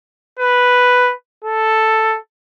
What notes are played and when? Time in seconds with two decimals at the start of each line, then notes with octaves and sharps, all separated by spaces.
0.39 B4
1.44 A4